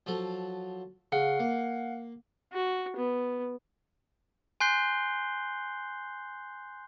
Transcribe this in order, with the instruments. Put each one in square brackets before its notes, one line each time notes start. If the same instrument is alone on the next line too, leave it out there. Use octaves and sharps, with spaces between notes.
[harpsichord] F3 F#3 A4
[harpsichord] C#3 [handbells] F5 F#5
[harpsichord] A#3
[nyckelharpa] F#4
B3
[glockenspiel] G#5 C6 F#6 G6 C7 G7